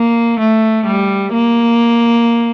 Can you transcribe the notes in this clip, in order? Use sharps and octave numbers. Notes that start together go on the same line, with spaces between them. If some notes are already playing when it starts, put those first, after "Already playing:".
Already playing: A#3
A3
G3
A#3